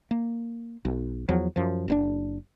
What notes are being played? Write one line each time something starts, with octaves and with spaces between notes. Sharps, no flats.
A#3
B1
E2 F3 F#3
F#2 F3
F#1 A#2 D4